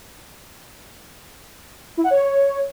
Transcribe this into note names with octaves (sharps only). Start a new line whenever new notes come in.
E4
F#5
C#5